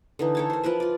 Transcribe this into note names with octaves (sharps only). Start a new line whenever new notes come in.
D3 E3 D#4
A4 C#5 A5
A#4 C5
F3 A#4 B4 E5
F4 D5